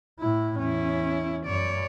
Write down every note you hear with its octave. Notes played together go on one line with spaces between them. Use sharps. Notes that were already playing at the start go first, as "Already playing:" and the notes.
A2 E4
E2 C#4 E4
F#2 C#5 D5